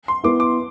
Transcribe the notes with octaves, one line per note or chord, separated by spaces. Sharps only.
C6
B3 E4 D6
D6